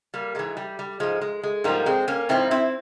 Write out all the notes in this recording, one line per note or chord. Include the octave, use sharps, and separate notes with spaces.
G3 A#3
G#2 E3 G#3
G3
G3
G#2 F3 G#3
G#3
G#3
G#2 F3 G3 A#3
G#3 C4
A#3 C#4
G#2 F3 C4 E4
C4 E4